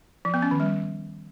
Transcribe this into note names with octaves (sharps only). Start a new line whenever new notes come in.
F3
B3
C#4
D#3
G3